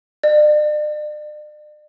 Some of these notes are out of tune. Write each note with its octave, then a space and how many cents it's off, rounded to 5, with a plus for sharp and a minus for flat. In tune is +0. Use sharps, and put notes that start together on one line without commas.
D5 +40